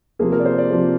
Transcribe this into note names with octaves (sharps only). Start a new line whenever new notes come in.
C3 F3 A#3 G#4
A#4
D5
C5
D5
C3 F3 A#3